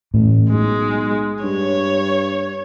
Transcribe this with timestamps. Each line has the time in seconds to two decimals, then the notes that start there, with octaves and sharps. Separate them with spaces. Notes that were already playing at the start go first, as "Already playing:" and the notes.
0.14 A1 A2
0.51 B1 G#3
1.44 G2 C#5